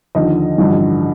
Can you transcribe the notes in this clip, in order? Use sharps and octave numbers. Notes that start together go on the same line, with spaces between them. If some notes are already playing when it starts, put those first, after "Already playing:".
D#2 D3 F3 D#5
A1 G2 D3 F3